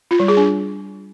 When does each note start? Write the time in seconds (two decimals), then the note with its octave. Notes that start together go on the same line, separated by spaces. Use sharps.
0.11 F4
0.20 G3
0.28 G#4
0.37 D4